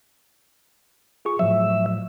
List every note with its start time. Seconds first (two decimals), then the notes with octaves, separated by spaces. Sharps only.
1.25 F4 G#4 C#6
1.39 A2 F3 F#3 E5